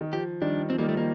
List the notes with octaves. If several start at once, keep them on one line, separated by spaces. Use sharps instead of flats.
D#3
F3 G4
D#3 G3 D4
F3 C4
D#3 G3 A#3
F3 A3
D#3 A#3